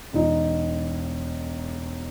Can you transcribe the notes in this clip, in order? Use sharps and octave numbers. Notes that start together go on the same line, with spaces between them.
E1 D#4